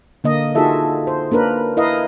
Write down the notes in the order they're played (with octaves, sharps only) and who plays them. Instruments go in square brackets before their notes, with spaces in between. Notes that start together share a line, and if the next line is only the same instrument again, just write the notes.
[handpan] D3 A#3 D#5
D#4 F4 F#4 G#4 A4 E5
C5
A#3 D4 A#4 B4
E4 A#4 B4 D#5 F5